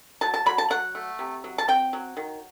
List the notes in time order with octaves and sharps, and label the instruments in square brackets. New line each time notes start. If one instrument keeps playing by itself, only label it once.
[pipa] F#3 A5
A5
F#3 B5
A5
F#3 F#5
A3
C3
F#3
A5
C4 G5
F#3
D#3